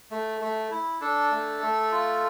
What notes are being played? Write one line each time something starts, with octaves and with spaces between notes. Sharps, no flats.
A3
A3
E4
D4 A4
A3
A3
F4